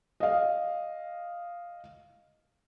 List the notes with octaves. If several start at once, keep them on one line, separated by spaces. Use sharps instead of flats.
D#5 F5